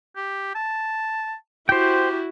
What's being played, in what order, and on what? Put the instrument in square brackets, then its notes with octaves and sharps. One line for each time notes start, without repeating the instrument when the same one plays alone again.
[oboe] G4
A5
[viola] E4 F#4 [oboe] G4 [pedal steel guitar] C5 G5